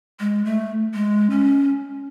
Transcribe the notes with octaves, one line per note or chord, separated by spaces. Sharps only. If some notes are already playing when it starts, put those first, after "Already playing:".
G#3
A3
G#3
C#4